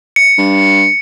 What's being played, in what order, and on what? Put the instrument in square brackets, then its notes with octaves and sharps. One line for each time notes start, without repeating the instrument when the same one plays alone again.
[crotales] C#7
[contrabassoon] G2